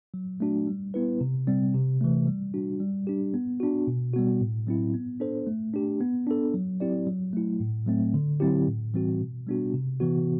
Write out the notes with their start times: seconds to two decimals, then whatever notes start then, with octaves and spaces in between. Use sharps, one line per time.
0.14 F#3
0.40 A3 D4 F#4
0.67 G3
0.94 B3 E4 B4
1.21 C3
1.47 G3 C4
1.74 C3
2.01 E3 A3
2.27 G3
2.54 D4 F#4
2.80 G3
3.07 D4 G4
3.34 B3
3.60 D4 F#4
3.87 B2
4.14 G3 B3 F#4
4.40 A2
4.67 F#3 C4 E4
4.94 B3
5.20 D4 A4 C5
5.47 A3
5.74 D4 G4
6.01 B3
6.27 D4 A4
6.54 F#3
6.80 C4 E4 G4 D5
7.07 F#3
7.33 A3 E4
7.60 A2
7.86 F#3 A3 C4
8.14 D3
8.40 F#3 C4 E4 G4
8.67 A2
8.94 E3 G3 C4 F#4
9.20 B2
9.47 G3 B3 D4 F#4
9.74 C3
10.00 E3 B3 F#4